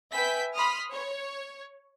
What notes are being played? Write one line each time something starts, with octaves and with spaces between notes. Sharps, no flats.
B4 E5 G5 G#5 G6 B6
B5 C6 D#6 F6
C#5